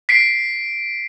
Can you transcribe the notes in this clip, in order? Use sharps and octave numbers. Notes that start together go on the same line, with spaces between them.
B6 C7 D7